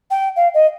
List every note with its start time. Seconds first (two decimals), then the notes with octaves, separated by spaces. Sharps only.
0.10 G5
0.36 F5
0.54 D#5